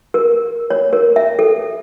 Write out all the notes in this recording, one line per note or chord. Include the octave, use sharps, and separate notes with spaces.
A#4
C#5
A#4
E5
A4